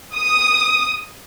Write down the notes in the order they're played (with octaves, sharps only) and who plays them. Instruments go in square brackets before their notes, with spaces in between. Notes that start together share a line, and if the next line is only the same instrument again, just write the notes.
[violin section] D#6